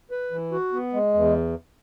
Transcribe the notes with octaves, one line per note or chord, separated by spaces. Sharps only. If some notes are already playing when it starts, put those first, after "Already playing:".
B4
E3
F#4
B3
G#3
E2